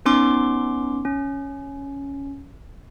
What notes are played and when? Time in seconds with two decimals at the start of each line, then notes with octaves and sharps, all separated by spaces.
0.06 B3 C#4 D#4 C6 D6
1.05 C#4